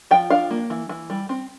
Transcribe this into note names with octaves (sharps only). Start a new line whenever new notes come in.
F3 G5
D4 F5
A#3
E3
E3
G3
C4